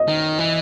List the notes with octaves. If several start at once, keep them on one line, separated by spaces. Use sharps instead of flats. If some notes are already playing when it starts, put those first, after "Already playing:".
Already playing: D#5
D#3
E3